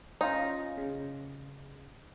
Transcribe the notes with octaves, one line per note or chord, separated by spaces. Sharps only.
C#4 D#4 F4
C#3